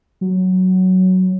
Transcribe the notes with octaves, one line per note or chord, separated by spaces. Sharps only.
F#3